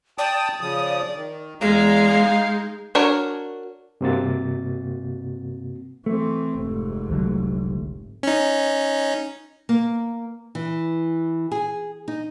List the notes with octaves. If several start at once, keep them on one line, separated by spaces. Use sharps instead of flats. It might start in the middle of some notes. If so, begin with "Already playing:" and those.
D5 G5 A5 D#6
C#3 F3 D#6
D#3
E2 G#3 F5 A#5
D#4
D4 F#4 A#4 C#5
G2 C3 A#3 C4 F#4 A6
E3 A3 C4
F1 G#2
C2 D3 F#3
C#4 D#4
A#3
E3
G#4
D#4